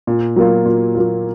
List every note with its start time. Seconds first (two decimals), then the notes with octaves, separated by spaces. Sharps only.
0.07 A#2
0.36 F#3 A#3 F4
0.65 A#2
0.95 F#3 A#3 F4